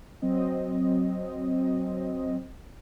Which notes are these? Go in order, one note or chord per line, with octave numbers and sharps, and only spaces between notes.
F#3 C4 D#5